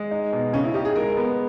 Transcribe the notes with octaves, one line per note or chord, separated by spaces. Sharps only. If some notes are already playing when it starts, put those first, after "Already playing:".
Already playing: G#3
D#4
B2
C#3 C#4
E4
D#4 G4
G#4
G#3 A#4
B3